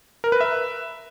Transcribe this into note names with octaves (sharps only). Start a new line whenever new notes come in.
A#4
B4
E5